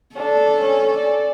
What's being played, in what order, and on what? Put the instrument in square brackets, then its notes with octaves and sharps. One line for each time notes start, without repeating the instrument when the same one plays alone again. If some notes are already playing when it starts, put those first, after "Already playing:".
[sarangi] D4 [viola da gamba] A4
[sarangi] C#4
D5